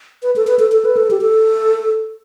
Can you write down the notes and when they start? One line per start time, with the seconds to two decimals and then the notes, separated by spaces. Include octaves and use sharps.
0.23 B4
0.36 A4
0.47 B4
0.59 A4
0.72 A4
0.85 B4
0.97 A4
1.11 G4
1.21 A4